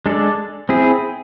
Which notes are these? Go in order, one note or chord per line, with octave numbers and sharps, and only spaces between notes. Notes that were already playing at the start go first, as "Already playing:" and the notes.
G#3 D4 A4 D5
C4 E4 G#4